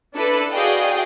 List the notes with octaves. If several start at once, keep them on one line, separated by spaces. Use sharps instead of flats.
D4 E4 A4 B4
F#4 G#4 D5 D#5 F5 G5